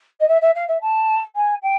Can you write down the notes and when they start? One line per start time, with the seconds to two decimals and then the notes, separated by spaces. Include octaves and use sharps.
0.20 D#5
0.28 E5
0.41 E5
0.55 F5
0.68 E5
0.81 A5
1.36 G#5
1.62 G5